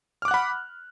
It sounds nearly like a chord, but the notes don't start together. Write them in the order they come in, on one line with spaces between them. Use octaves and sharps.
F6 D6 F#6 F#5 B5